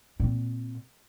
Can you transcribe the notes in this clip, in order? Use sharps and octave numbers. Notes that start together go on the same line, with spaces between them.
A#2 C4